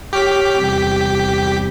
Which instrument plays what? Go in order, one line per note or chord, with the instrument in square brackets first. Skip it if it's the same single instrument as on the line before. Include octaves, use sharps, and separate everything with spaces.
[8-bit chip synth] G4 B6 [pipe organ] C#5 D6 F6
[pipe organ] E2 C3 G3